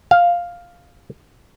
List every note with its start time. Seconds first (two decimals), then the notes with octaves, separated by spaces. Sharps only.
0.11 F5